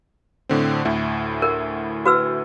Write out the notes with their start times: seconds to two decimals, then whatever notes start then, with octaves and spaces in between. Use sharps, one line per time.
0.49 A2 D3 C4
0.85 D2 A2 E4
1.42 A#4
2.06 F#4 B4 E6